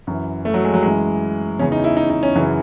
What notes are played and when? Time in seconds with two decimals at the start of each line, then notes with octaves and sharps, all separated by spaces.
0.07 F#2 E3
0.45 A3
0.54 F#3
0.65 G#3
0.74 F#3
0.83 F#2 E3 G#3
1.59 E2 C#3 E3 C#4
1.72 D#4
1.84 E4
1.97 D#4
2.10 D#4
2.23 C#4
2.35 F#2 C#3 E3